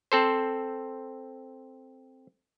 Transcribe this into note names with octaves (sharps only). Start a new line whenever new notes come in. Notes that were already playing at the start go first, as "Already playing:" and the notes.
C4 A4 C5